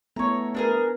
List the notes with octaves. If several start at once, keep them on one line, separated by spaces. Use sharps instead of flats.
A3 B3 E4 C#5 A#5
D4 G#4 A#4 B4